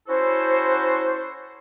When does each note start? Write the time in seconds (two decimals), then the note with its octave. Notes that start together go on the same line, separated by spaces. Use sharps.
0.08 C#4 E4 F#4 A4 C5